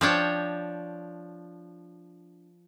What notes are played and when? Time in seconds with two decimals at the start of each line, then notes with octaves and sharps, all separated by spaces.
0.01 F3 D4 C#5 G5